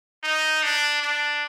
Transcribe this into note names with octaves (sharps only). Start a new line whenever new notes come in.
D#4
D4
D4